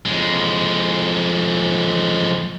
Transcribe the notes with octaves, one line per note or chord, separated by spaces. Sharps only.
F2 G#3